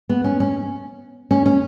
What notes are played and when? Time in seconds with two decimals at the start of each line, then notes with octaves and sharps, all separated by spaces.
0.09 B3
0.24 C#4
0.40 C#4
1.31 C#4
1.46 C#4